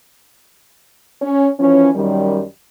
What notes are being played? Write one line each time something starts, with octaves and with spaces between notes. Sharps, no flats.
C#4
E3 F3 C#4
F#2 D#3 G3